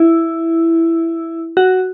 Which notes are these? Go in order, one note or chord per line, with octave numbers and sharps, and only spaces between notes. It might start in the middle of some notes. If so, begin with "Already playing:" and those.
Already playing: E4
F#4